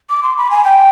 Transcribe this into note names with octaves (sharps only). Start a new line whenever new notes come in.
D6
C6
B5
G#5
G5